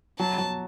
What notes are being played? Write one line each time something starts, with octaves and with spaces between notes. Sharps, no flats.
F#3 A5
F#3